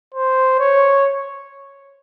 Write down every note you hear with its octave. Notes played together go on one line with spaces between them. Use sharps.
C5
C#5